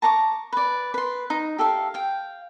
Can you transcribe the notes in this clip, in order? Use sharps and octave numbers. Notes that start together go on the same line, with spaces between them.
A5 A#5 C#6 D6
B4 D5
B4 C6
D#4
G4 A4 E5 F5
F5 G5